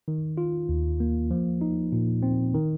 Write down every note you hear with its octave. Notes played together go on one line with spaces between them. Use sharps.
D#3
F4
D#2
A#3
F3
D#4
A#2
C4
D#3